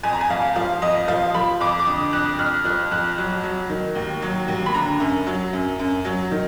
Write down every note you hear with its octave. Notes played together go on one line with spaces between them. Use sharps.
F2 G#5
A#5
G#5
F2 F5
F3 F5
F2 D#5
F3 F5
F3 B5
F2 D6
D6
D3 D#6
F2 F#6
F2 F6
F3 F#6
F2 F#6
F#3
F#3
D#3
D#2
F#3
D#2
B5
D3 A#5
F#2
F#3
F#2
F#2
F#3
D#3